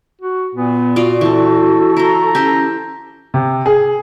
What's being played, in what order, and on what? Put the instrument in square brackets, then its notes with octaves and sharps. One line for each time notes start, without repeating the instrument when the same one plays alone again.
[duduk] F#4
[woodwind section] A#2 [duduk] B3
[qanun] F4 D5 F5 [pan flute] F#4
[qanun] E3 C4 [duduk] A4
[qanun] E4 C5 [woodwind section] A#5
[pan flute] C#4 [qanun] G4 C5
[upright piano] C3
G#4